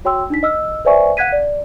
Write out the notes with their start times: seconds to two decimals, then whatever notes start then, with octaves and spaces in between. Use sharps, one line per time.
0.05 F#4 C#5 G5 C6 E6
0.30 D4 D#4 B6
0.43 D#5 E6 F6
0.85 B4 C5 D5 E5 G#5 C#6
1.17 F5 F#5 F#6 G#6 B6 D#7
1.32 D5